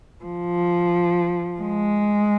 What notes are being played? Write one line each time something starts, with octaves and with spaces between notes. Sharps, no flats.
F3
G#3